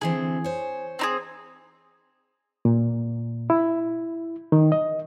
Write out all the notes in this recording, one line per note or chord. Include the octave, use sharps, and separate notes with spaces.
D3 E3 C4 G#4
C5 C#5
C4 D#4 G#4
A#2
E4
D#3
D#5